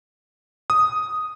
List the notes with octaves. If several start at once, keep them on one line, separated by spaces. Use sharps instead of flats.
D#6